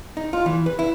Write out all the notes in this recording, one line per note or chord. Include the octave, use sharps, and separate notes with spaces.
D#4
F4
E3
B4
E4